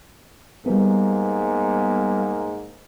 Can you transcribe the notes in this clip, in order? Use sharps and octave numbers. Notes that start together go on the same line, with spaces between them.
G#2 G3 A#3 B3